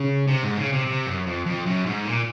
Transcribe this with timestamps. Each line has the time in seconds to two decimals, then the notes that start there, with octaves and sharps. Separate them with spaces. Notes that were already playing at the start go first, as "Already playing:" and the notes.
Already playing: C#3
0.27 C3
0.42 G#2
0.56 C#3
0.72 C3
0.87 C3
1.06 F#2
1.26 F2
1.46 F2
1.66 F#2
1.86 G#2
2.05 A#2